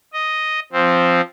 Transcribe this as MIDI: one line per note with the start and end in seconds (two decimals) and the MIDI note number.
0.13 0.60 75
0.73 1.21 53
0.73 1.21 60